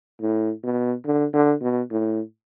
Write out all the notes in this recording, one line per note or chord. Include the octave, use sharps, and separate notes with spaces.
A2
B2
D3
D3
B2
A2